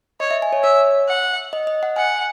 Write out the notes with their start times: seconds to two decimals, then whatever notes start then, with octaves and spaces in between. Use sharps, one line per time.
0.20 C#5 D#5
0.31 E5
0.42 G#5
0.53 C#5
0.63 C#5 E5
1.08 F#5
1.53 D#5
1.67 D#5
1.83 F#5
1.96 F#5 G#5